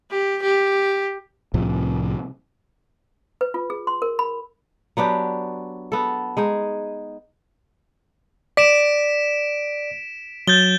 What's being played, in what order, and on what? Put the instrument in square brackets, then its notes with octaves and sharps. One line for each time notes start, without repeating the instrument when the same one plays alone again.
[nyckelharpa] G4
G4
[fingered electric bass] C2 A2 C3 F3
[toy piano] B4
F4
G#4
C6
A#4
B5
[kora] F#3 B3 D4 G4
B3 A4
G#3 D#4 G#4
[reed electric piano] D5 [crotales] B6 D7 E7
[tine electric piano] F#3 [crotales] G6 A6 G7